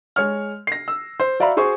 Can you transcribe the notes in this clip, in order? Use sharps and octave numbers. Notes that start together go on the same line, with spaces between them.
G#3 C#5 F6
A#6 C7
E6
C5
F#4 D5 E5 F5 A#5 B5
F#4 G#4 C5 C#6